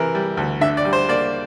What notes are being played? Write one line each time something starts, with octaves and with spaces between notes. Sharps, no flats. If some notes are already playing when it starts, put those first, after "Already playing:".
Already playing: C3 E3 A#4
G3
D2
D3 E5
D5
G3
C5
A#3 D5